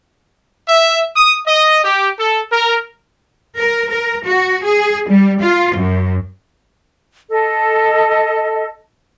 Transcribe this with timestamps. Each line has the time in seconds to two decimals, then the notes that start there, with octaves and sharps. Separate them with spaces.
0.68 E5
1.15 D#6
1.46 D#5
1.83 G4
2.19 A4
2.51 A#4
3.58 A#4
3.90 A#4
4.25 F#4
4.64 G#4
5.09 G3
5.41 F4
5.75 F#2
7.29 A4 D#5